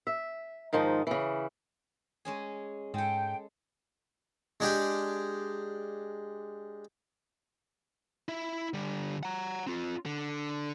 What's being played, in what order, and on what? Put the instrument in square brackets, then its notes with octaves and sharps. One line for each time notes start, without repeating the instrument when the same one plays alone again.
[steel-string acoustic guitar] E5
G#2 D#3 F3 D#4
C#3 E3
[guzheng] G#3 C#4 G#4
[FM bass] G#2 [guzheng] G#3 A4 [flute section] G5
[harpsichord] G#3 D4 G4
[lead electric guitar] E4 E5
D3 G3
F#5 A#5
C4 F4
D3